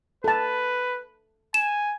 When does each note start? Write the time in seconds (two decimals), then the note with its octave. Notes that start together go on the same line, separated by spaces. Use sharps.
0.24 A4 B4 A5
1.54 G#5 E7